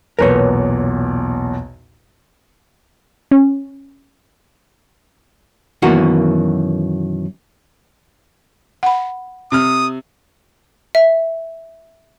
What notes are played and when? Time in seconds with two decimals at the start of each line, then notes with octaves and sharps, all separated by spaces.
0.19 B1 E2 A#2 A#4 B4 C#5
3.31 C#4
5.82 F#2 B2 D#3 E3 A#3 F#4
8.83 F#5 B5
9.52 C3 D#6 F6
10.95 E5